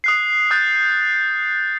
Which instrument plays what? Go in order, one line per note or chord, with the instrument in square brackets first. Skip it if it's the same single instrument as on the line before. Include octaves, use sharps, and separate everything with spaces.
[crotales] D#6 F#6 C7
D#6 F#6 G6 A6